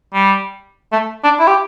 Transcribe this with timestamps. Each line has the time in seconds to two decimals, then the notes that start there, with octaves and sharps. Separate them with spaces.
0.14 G3
0.92 A3
1.24 D4
1.40 E4
1.47 G4